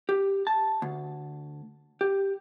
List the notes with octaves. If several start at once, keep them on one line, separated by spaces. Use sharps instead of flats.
G4
A5
D2
G4